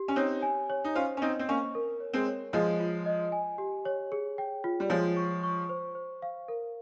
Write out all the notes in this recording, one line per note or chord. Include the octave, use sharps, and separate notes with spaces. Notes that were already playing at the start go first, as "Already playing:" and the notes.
Already playing: G4
C#4
C4 D#4 C#5
G#5
C#5
D#4
C#4 F4 C5
C#4
C4 D#4 D#5
C4
A#3 C#4 C#6
A#4
C#5
G#3 C4
C#5
F3 G#3 D#5
F4
D#5
G#5
G4
C#5
G#4
G5
F4
G3
F3 G#3 C#5
C#6
C#6
C5
C5
F5
A#4